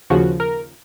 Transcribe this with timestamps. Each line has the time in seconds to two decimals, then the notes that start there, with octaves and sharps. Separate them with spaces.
0.10 D#2 C#3 F3 F#4
0.40 A#4